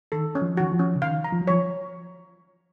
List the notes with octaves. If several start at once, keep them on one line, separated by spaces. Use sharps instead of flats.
D#3 A4
C#4
F3
D#3 F#4
F3
C#4
C#3
D#3 F5
A#5
F3
F#3
F3 C#5